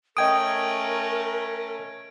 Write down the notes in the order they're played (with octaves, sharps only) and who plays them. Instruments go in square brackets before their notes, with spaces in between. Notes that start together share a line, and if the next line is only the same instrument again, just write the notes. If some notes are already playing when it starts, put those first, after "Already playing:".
[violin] A3 C#4 [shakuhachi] A#4 [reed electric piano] D#5 G5 D#6 [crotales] G#6 D7